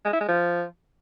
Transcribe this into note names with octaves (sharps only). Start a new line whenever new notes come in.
G#3
E4
G#3
F3